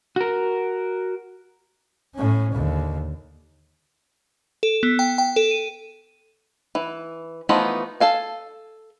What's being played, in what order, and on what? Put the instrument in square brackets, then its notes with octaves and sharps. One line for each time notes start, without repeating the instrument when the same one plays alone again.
[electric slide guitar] F#4 A#4
[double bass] A2 C#4
D#2 D3
[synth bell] A4
B3
G5
G5
A4
D#7
[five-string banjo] E3
E3 F3 A3 B3 D#4
A4 F5 G#5